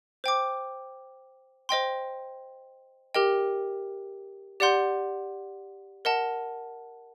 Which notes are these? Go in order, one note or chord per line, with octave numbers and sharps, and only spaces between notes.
C5 G5 D6
C5 D#5 G5 C6
G4 A#4 D#5 G5
G4 D5 F#5 C6 G6
A#4 D#5 F#5 A5